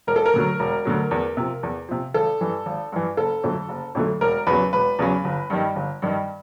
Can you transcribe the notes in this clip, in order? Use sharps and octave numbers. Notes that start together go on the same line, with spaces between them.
E1 A#4
A4
A#4
D2 D3 F#3
E1
D2 D3 F#3
E2
C3 F3
E2
C3 F3
G#1 A4
G2 E3
G#1
G2 E3
F#1 A4
F2 D3 F#3 A3
F#1
F2 D3 F#3 A3
E1 A#4
E2 C#3 F#3 B4
E1 B4
E2 C#3 F#3
G1
G2 D#3 G3
G1
G2 D#3 G3